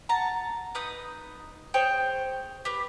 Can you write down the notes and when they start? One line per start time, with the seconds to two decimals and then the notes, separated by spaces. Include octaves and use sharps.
0.09 F#5 A5 A#5
0.75 D#4 B4 D#6 G6
1.74 G#4 C5 C#5 G5
2.65 G4 B4